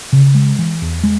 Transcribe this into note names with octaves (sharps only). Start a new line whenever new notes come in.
C#3
G#3
E3
E2
G#3